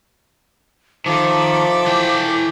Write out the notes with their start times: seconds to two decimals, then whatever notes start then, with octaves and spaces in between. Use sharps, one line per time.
1.06 D#3 F3 A4 E5 D6
1.86 E3 G5